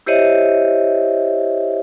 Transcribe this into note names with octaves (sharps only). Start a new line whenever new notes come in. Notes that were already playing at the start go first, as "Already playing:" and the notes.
E4 G4 C5 C#5 D#5 E5